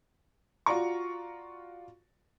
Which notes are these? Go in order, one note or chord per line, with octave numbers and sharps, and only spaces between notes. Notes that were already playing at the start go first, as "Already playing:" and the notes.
F4 F#4 D5 A#5 C#6